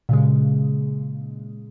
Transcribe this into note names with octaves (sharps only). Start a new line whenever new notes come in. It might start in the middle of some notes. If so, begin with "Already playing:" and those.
A#2 C#3 G#3